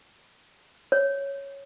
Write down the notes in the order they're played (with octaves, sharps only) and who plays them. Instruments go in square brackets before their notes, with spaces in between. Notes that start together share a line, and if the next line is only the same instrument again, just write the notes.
[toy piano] C#5